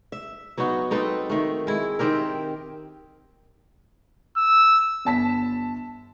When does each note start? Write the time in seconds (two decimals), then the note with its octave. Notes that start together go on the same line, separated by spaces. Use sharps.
0.12 E5
0.58 F#3 B3 D#4 F#4
0.91 C4 D#4 A4 B4
1.30 D#3 A3
1.67 G#3 E4
1.99 D#3 C4 G4 A#4
4.37 E6
5.05 G1 A5 B6